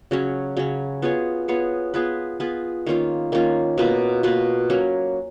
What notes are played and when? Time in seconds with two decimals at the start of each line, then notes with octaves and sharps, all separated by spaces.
0.11 C#3 F#3 C#4
0.57 C#3 F#3 C#4
1.02 B3 F4 G#4 C#5
1.48 B3 F4 G#4 C#5
1.94 B3 F4 G#4 B4
2.40 B3 F4 G#4 B4
2.86 D#3 A#3 C#4 F4
3.32 D#3 A#3 C#4 F4
3.78 B2 A#3 F4 B4
4.23 B2 A#3 F4 B4
4.70 F#3 A#3 C#4